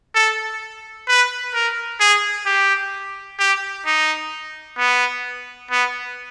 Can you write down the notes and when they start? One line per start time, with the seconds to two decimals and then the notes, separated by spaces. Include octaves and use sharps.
0.15 A4
1.08 B4
1.54 A#4
2.00 G#4
2.46 G4
3.39 G4
3.86 D#4
4.78 B3
5.71 B3